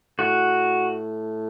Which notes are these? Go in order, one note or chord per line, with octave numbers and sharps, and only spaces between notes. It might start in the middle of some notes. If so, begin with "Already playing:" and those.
A2 F#4